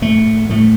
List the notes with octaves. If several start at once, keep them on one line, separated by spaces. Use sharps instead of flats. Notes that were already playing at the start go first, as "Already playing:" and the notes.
A2 A3
A2 A3